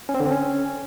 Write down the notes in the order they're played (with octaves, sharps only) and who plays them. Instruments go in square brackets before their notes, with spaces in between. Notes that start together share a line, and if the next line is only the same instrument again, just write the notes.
[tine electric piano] C#4
C4
D3
C4
C#4